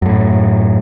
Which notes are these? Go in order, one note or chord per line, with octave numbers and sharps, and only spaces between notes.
F#2 A2